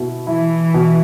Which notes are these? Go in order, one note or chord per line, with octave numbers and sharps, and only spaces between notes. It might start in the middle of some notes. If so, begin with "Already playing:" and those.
Already playing: B2 E4
E3 E4
B2